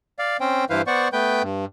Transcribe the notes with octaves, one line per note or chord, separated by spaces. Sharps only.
D5 F5
C4 C#4 C5 G5
G2 E3 E4 B4 C5 F5
B3 C5 D5 F#5 C#6
A3 B3 B4 G5 G6
G2